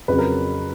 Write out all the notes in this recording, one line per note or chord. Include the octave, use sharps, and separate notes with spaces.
F2 C#3 F#3 B4
A#4